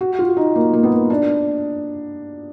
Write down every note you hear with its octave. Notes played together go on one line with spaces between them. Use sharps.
F#4
F4
D#4
A#3
A#3
B3
A#3
D4